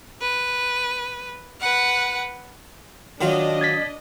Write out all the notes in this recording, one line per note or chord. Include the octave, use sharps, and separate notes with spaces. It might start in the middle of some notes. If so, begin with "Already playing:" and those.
B4
B4 F#5
D#3 F#3 D4 F4 D#5
G#6 A6 B6